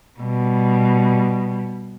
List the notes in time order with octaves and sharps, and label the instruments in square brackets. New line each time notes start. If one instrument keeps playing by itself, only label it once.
[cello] B2 G3